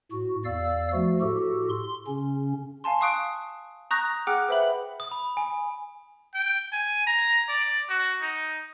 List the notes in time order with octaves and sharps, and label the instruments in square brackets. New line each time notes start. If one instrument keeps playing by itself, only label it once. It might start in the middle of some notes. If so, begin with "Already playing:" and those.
[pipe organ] A2 F#4
E2 D5 F5 E6
F3 A3 F#4
A2 F#4 G4 A4
C6
C#3 C#4
[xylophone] F5 G#5 A5 C6
F5 C#6 D#6 F#6 D7
A#5 C#6 D#6 F#6 G6 A#6
G#4 F#5 G5 D6 F6 F#6
B4 C5 E5 B5 F#7
[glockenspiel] D#6
B5
G#5
[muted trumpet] G5
G#5
A#5
D5
F#4
D#4